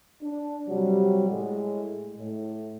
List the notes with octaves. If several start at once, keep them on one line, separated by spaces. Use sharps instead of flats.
D4
C3 F#3 G3
A2 G#3
A2